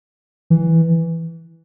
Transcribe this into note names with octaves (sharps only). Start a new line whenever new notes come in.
E3